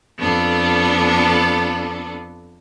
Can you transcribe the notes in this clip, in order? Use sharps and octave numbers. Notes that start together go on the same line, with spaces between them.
F2 B3 D4 A4